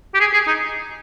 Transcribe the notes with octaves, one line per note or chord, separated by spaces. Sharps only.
G4
G#4
G#4
D#4